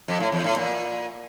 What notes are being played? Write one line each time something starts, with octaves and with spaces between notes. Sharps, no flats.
F2
A2
E2
A2
A#2